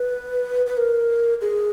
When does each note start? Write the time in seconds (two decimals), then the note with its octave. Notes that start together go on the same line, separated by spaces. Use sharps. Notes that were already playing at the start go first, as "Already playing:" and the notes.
Already playing: B4
0.66 B4
0.77 A#4
1.41 G#4